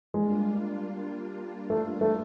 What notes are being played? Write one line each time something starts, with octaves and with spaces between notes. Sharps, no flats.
G3 G#3 A#3 D4 F4
A3
A3